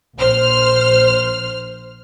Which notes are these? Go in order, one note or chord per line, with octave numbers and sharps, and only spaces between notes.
A#1 C5 F6